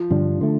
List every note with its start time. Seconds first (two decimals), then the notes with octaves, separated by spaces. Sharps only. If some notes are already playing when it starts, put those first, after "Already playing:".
Already playing: F3
0.10 G2 D3 G3 D4
0.41 D3 A3